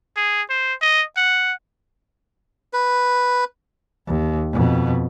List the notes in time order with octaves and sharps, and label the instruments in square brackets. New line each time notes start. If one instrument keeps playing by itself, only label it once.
[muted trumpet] G#4
C5
D#5
F#5
[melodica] B4
[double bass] D#2
F2 B2